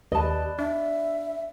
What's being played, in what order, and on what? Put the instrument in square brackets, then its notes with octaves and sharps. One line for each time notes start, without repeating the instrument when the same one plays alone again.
[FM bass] D#2 [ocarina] G4 [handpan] B4 D5 [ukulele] D#5 A5
[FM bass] D4 [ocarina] E5